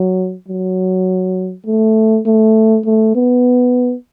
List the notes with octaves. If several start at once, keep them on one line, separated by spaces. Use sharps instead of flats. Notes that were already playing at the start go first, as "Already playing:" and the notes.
Already playing: F#3
F#3
A3
A3
A3
B3